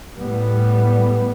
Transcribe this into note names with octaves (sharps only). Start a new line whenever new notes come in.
A2 G3 B3